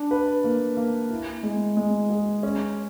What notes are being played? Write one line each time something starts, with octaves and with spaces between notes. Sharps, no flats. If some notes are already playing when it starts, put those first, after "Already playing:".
Already playing: D4
B4
A#3
A#3
E4
G#3
G#3
G#4
C#4